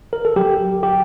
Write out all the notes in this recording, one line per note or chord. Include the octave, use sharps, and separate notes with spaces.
A#4
A4
F#3 G4
G4